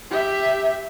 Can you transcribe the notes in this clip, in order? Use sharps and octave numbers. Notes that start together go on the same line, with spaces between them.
G4 E5